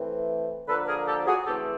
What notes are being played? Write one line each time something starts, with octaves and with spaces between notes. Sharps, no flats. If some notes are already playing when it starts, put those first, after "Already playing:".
Already playing: E3 A3 C4
D3 F3 A#3 A4 B4
G#4 A#4
G4 A4
F#4 G#4
C#3 E3 A3 C4 G4 A4